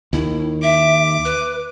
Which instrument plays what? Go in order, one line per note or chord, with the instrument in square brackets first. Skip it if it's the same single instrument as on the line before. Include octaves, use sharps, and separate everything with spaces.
[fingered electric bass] D#2 D#3 [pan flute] E4
[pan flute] E5 [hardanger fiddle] D6
[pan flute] B4